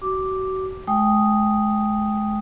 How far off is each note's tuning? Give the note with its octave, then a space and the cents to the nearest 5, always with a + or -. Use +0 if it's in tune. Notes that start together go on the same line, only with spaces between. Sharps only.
F#4 +35 D6 +0
G#3 +35 G5 +0 D#6 +0